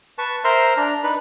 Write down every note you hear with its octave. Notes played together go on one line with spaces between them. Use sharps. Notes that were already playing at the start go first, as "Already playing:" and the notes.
B4 A5 C#6
A#4 C5 E5 A#5 C6
D4 A#5
D4 D#4 B4 B5